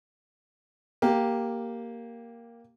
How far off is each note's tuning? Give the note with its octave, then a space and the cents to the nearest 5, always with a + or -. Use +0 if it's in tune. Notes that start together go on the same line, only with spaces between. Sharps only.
A#3 +0 G4 +0